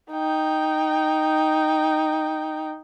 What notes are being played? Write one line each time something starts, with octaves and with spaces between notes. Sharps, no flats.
D#4 G5